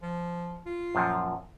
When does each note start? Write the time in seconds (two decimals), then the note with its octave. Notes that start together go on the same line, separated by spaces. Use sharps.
0.02 F3
0.66 F4
0.95 F#2 A#2 F3